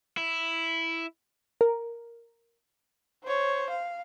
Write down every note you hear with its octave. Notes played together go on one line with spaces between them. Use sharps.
E4
A#4
C5 C#5
F5